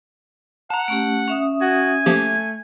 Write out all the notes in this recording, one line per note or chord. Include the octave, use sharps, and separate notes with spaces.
F#5 A5 A#5
A3 C#4 G4
C#4 E5 D#6
F#4 G#5
F3 A3 A#3 G4